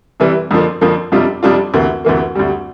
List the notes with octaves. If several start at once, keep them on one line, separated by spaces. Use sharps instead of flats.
C3 E3 G3
F2 D3 F3 A#3
F2 D3 F3 A#3
F2 C3 G3 D4 F4
F2 C3 G3 D4 F4
D2 C3 E3 A#3
D2 C3 E3 A#3
D2 C3 G3